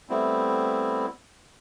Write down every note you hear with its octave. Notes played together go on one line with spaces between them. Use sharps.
G3 A3 B3 C4 E4